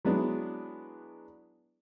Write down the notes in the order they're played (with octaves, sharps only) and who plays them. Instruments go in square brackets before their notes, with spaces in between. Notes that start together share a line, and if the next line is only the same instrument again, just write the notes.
[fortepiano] F#3 G#3 B3 D4 E4